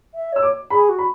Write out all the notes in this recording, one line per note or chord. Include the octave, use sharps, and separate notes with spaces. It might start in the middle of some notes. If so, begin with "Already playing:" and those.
E5
C#5 E6
D6
G#4 B5
F#4
B5